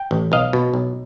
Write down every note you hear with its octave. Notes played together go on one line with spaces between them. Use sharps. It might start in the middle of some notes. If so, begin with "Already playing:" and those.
Already playing: G5
A1
B1 D#5 F5
B2
B1